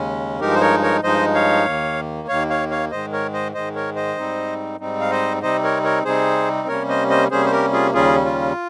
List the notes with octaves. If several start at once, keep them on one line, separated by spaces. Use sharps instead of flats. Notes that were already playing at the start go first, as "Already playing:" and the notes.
Already playing: D#2 C#3 G#3 C#4
G2 F3 G#3 D#4 G4 A#4
C5
A#4 C#5
A#4 C#5
G2 F3 G#3 D#4 C5 D#5
C#5 F5
D#2 D#3 A#3
D#2 D#3 A#3 C#5 F5
C#5 F5
C#5 F5
G#2 D#3 G#3 C5 D#5
A#4 C#5
C5 D#5
G#2 D#3 G#3 C5 D#5
A#4 C#5
C5 D#5
G#2 G3 C4 D#4
G#2 G3 C4 D#4
F5
C5 D#5
C3 G3 C4 D#4 C5 D#5
A#4 C#5
A#4 C#5
C3 G3 C4 D#4 G#4 C5
C3 G3 A#3 C#4 A#4 C#5
C5 D#5
C5 D#5
C3 G3 A#3 C#4 G#4 C5
C5
G4 A#4
F4 G#4
D#2 C#3 G3 C#4 F4 G#4
F4